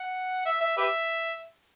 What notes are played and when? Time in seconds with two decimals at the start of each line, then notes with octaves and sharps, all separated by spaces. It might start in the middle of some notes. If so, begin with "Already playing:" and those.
Already playing: F#5
0.46 E5
0.61 E5
0.77 G4 B4 E5